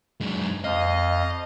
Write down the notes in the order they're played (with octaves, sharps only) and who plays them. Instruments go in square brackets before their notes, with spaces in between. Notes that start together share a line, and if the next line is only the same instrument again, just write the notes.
[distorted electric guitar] F#2 G#3
[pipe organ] F2 F5 [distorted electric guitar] D#5